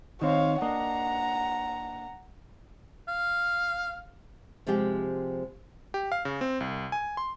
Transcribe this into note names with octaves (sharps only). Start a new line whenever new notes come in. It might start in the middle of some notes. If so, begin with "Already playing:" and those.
D#3 C4 C5 C#5 F5
A#3 D4 D#5 F#5 A#5
F5
C3 F3 G#3 C4 G4 G5
G4
F5
C#3
C4
C2
G#5
C6